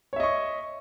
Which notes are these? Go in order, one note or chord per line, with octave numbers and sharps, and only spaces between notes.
C#5 D#5 E5 C#6